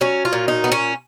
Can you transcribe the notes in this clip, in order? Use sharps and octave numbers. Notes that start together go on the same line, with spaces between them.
F#3 C#4
F4
A#2
D#4
B3
C#4